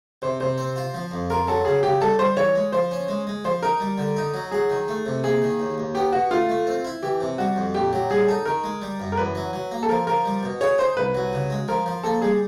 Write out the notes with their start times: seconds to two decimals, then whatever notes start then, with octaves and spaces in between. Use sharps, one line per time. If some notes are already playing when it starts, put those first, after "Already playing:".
0.22 C3 C5
0.40 C3 C5
0.58 C4
0.76 F4
0.94 F3
1.11 F2
1.30 F4 A#4
1.47 F#3 A4
1.65 C#3 G#4
1.83 C#3 G4
2.01 G3 A4
2.19 G3 C5
2.37 E3 C#5
2.55 G#3
2.72 F3 C5
2.91 C#4
3.08 G#3
3.27 G#3
3.45 F3 C5
3.62 D#4 A#4
3.80 G3
3.98 D3
4.17 D#4
4.34 F#3
4.51 F#3 G#4
4.70 D#3
4.88 A3
5.06 C3
5.24 A#3 G#4
5.42 D#3
5.60 D#2
5.78 D#2
5.95 B3 G4
6.13 B2 F#4
6.31 A3 F4
6.49 A3
6.67 C4
6.85 E4
7.03 E3 G4
7.21 C3
7.38 G3 F#4
7.56 F2
7.74 A#2 G4
7.93 F#3 G4
8.10 G3 G#4
8.28 D#4 A4
8.45 D#3 A#4
8.64 G#3
8.82 G3
9.00 F#2
9.12 A#4
9.17 E2 B4
9.35 F#3
9.53 F#3
9.71 A#3
9.83 A4
9.89 F3 A#4
10.07 F3 A#4
10.25 G3
10.43 B2
10.61 G#4 C#5
10.78 D#4 C5
10.97 C2 B4
11.15 F#3
11.33 C#3
11.50 G#3
11.68 F3 A#4
11.86 F3
12.03 A#3 A4
12.22 G3 G#4